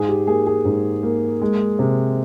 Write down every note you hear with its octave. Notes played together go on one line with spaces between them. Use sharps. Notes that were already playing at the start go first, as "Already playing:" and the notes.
Already playing: G#2 G#4
G4
A#3 G#4
G#4
G#2
A#3
G#3
C3